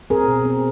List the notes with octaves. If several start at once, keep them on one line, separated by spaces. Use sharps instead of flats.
C4 G#4 A#4
B2
C4